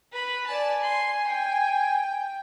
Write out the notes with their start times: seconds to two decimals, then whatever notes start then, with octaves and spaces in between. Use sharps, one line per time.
0.12 B4 B5
0.47 D5 G#5 A5
0.83 C6
1.27 G5